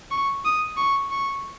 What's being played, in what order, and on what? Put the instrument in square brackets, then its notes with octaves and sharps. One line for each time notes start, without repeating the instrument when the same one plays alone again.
[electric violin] C#6
D#6
C#6
C#6